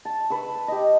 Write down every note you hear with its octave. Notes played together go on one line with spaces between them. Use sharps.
A5
B4 C#6 E6
G4 D#5